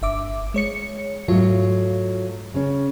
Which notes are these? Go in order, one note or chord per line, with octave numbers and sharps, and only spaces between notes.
G1 E5 D6
G#3 C#5 C#7
G#2 F#3 A3 F4
C#3 C#4